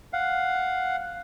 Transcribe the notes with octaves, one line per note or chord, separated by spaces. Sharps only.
F5 F#5